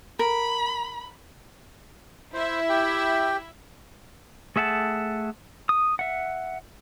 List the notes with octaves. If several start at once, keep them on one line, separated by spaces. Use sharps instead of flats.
A#4 B5
E4 C5 E5
G4 G5
A3 G#4 E5 F#5 A5
D#6
E5 F#5